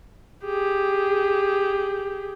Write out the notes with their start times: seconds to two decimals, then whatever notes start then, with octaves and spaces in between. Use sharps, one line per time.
0.45 G4 G#4